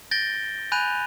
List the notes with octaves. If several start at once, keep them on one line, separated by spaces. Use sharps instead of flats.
G6 A6 A#6 D7 G7
G#5 B5 F#6 G6 D#7 F7